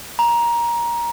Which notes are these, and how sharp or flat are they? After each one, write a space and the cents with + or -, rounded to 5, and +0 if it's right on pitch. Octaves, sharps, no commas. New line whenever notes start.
A#5 +15